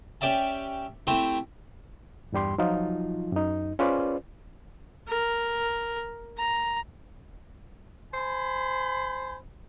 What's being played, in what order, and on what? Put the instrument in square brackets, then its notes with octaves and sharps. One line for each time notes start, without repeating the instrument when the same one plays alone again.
[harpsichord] C#4 G4 D5 E5 A5
A3 C4 E4 G4
[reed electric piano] E2 G2 G3 G4 C6
F3 F#3 D#4 F4
F#2 D#4
C#4 F4 G#4 B4 C5 D5
[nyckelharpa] A#4
A#5
[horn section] C5 G#5 B5